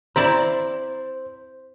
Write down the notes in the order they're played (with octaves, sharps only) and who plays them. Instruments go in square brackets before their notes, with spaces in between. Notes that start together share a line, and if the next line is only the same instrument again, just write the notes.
[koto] C4 E4 D5 [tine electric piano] C5 [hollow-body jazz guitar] A#5